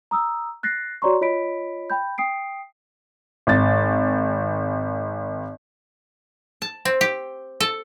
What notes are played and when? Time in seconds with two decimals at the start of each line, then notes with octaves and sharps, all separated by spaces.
0.11 A#5 D#6 E6
0.63 F#6 A6 A#6 C7
1.02 F#4 C#5 D5 A#5 C6 C#6
1.21 F4 C#5 D#5 B5 B6 D7
1.90 G5 B5 G6
2.18 G5 D#6 C7 D7
3.47 G#1 A6
6.62 A5
6.85 C4
7.01 G4
7.60 A4